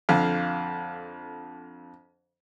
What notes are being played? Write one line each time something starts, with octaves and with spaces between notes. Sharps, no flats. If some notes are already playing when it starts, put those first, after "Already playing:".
F2 D3 F5